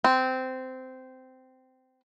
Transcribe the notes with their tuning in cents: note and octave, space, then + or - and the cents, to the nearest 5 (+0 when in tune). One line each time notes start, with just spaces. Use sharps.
C4 -15